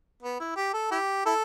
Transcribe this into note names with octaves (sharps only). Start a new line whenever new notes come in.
B3
E4
G4
A4
E4 G4
E4 A4